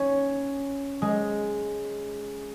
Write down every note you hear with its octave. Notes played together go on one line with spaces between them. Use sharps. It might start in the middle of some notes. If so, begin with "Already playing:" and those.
Already playing: C#4
G#3